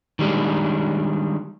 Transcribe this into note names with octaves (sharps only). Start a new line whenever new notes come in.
D#3 G3 G#3 D4